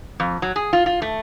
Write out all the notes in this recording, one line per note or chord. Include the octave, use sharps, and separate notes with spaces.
F2
F#3
G#4
F4
F4
A3